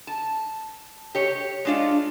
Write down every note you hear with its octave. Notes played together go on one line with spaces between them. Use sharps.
A5
G4 C#5
G#3 D4 F4